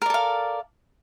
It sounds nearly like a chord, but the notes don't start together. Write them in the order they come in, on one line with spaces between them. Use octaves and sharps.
A#4 D5 A4 F5